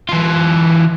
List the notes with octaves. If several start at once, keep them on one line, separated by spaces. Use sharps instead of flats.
E3 F4